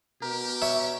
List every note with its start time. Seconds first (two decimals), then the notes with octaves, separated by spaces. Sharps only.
0.22 B2 G4 A#4
0.62 C#5 E5